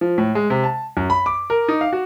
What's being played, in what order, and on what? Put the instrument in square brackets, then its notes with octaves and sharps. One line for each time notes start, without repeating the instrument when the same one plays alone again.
[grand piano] F3
A2
G#3
C3
A5
F#2
B5
D6
A#4
D#4
F5
F#4